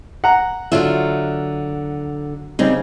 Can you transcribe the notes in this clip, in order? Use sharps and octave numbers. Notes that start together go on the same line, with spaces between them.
F#5 A#5
D3 F#3 F4 E5
C#3 G3 C4 D#4